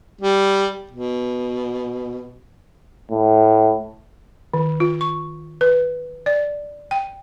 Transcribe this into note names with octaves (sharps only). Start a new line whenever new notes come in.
G3
B2
A2
D#3
F4
C#6
B4
D5
G5